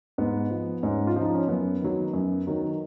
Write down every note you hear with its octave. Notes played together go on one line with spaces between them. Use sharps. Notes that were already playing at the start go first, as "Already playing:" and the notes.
G#2 B3
F3
G#2 C#4
F4
F3 D#4
C#4
F#2 B3
D#3 F#3
F#2
D#3 F#3